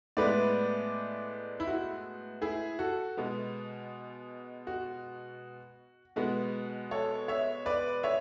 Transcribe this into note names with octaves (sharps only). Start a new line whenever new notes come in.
A2 G#3 B3 B4 D5
E4
F#4
E4 G#4
F#4 A4
B2 G#3 B3
F#4
B2 G#3 B3 F#4
A4 C#5
C#5 E5
B4 D5
C#5 E5